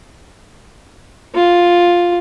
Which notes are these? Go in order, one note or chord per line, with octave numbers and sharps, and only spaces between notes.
F4